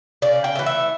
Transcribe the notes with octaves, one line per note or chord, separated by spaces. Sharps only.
C#3 D5
G5
E3 A3
E5